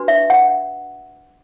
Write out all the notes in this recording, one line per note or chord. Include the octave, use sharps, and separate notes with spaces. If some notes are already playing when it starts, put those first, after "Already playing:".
Already playing: D4 F#4 B4
E5
F#5